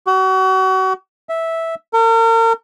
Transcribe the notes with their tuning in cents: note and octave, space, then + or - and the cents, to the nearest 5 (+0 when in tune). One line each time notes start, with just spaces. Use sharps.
F#4 +35
E5 -10
A#4 -40